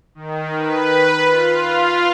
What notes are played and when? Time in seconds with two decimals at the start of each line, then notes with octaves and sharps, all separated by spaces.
0.15 D#3
0.57 B4
1.25 F4